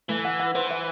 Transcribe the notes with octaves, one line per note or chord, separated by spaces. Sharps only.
E3 A3
F#5
F#5
E3 C5
E5